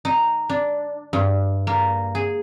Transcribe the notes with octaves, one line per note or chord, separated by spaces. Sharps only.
D#4
D4
G2
A#3
G#4